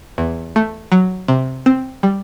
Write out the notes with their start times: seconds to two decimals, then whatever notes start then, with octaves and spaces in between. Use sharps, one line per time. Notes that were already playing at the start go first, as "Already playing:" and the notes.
0.18 E2
0.56 A3
0.92 F#3
1.28 C3
1.66 C4
2.03 G3